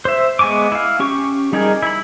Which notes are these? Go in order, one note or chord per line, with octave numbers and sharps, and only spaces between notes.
C5 E5
G#3 B3 G#5 C#6 D6
E4 F5
C#4 G4 C#6
G3 D#4 G4 G#4 A#4
E4 B5